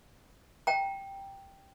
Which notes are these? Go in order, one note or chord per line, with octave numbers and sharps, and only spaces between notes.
G5 A#5